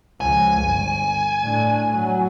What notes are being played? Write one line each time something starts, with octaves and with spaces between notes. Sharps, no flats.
C#2 F3 G#5
G1
A2 D4
F#3